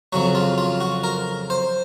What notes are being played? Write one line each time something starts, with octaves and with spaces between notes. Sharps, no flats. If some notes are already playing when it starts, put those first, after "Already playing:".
F2 C#3 F#3 F#4
F4
F4
F#4
A#4
C5